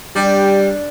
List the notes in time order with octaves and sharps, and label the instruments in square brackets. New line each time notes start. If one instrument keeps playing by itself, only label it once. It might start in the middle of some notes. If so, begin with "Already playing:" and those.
[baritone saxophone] G3 [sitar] D4 [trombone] G4